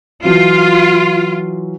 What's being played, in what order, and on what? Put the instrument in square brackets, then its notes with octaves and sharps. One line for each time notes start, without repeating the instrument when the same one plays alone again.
[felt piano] E3 F#3 [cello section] F4